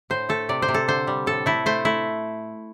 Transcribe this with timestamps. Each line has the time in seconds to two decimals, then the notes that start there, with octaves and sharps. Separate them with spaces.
0.10 A2 C5
0.29 A3 A4
0.49 C3 D5
0.62 C5
0.68 C3
0.74 A4
0.88 D3 C5
1.07 G3
1.26 A2 A4
1.46 A3 E4
1.66 A3 C5
1.85 A3 E4